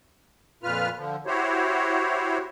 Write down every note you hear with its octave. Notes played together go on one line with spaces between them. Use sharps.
F2 A#2 F4 B4 F6
D3 F3
E4 F#4 G4 C5 C#5